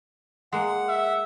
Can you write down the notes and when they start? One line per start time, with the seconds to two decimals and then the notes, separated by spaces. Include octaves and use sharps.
0.53 G#3 A#3 F#5
0.88 E5